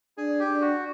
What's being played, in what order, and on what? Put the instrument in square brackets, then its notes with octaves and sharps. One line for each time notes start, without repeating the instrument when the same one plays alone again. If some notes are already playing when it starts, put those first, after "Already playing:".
[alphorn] D4 [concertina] G#4
[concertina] G4
[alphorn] D4
[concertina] F#4